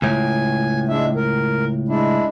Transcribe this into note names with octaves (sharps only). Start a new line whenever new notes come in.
C#2 A2 G#5
G#3 D4 E5
A#4
G#3 D4 E4